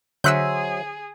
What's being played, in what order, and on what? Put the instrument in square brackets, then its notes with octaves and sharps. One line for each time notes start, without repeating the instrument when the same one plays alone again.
[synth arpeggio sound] D3 [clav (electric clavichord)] F#3 C5 E5 [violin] G#4 [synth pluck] E6 F#6 G6